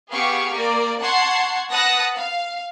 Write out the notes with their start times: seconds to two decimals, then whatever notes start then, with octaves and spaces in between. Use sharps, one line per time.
0.12 B3 G4 G#4 F5 C#6
0.54 A#3 A#4 D5
1.02 F#5 A5 C6 C#6 G#6 C7
1.71 B4 F#5 A5 D#6 F#6 A#6
2.17 F5